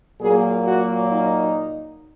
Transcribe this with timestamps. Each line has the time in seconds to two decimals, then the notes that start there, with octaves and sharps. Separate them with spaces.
0.20 A#2 F#3 A#3 G#4
0.66 F#4
1.12 D#4